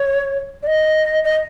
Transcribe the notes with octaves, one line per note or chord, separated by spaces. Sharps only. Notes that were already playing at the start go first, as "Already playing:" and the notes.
Already playing: C#5
D5
D#5
D#5